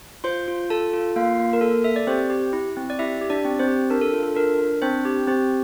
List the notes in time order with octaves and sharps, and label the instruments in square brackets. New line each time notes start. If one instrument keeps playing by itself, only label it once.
[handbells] F4 C5 C6
F4
F4 A4 A5
F4
A#3 F4 F5
A#3
A#4
A#3 A4
A4 E5
D5
C4 G4 C5
G4
E4
C4
D5
E4 G4 E5
G4
D4 D5
C4
C4 C5
G4
D4 A#4
A4
F4
A4
D4 A#4
D4
C4 D4 C5
G4
C4 G4 C5